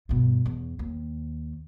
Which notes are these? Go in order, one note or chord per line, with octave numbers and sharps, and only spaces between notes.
G2 B2
E2
D#2